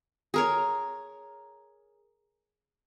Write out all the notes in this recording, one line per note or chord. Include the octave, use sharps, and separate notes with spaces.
G#4 A#4 C#5